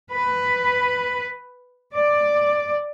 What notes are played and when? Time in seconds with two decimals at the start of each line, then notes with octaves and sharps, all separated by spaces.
0.13 B4
1.96 D5